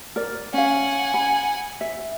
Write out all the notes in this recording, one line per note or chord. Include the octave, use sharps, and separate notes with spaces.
A#4 D5
C#4 F5 F#5 G#5
B5
E5